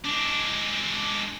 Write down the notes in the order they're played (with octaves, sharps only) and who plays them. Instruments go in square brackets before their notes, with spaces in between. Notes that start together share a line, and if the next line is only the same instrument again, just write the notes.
[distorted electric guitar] G#3 D4